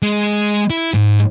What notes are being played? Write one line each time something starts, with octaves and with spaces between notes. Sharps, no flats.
G#3
E4
G#2